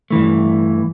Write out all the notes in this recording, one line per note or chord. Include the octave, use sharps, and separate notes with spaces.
G2 E3 A3